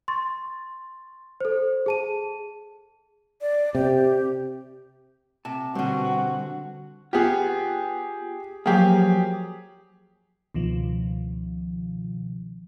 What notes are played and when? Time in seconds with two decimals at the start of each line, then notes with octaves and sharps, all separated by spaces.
0.08 C6 C#6 A6
1.40 A4 C5
1.86 G#4 A5 D#7
3.42 D5
3.75 C3 G4
5.45 C3 A5
5.75 B2 D3 G3 C4 F#4
7.13 B3 F4 G4 G#4
8.66 F3 F#3 A#3 G4 G#4
10.54 C#2 B2 D#3 F3